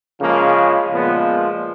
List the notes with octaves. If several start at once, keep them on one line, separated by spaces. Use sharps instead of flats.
C#3 F3 G#3 A#3
A#2 F3 G#3 B3